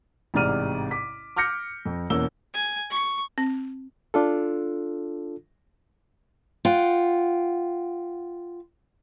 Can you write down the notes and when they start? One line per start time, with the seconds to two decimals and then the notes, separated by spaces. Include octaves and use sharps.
0.34 A1 G#2 C3 D5 F6 D#7
0.91 D6 B6
1.37 D6 F6 G6 A#6 C#7
1.85 F2
2.10 E2 B2 A#3 C#4 E6 G7
2.55 G#5
2.91 C#6
3.38 C4
4.14 D4 F4 A4
6.65 F4 F#5 G5